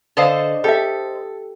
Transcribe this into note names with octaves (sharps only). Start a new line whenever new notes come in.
D3 C5 D5 D#5 F5 A5
G4 A4 E5